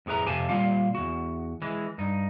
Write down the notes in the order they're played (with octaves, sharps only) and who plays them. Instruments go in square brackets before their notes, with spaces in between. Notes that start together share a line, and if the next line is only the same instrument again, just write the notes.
[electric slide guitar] F2 A2 G#4 B4 A#5
F2 C3 G4 F5 G#5 A5
A#2 G3 F4 F5
E2 F#4
E3 G#3
G2 D#4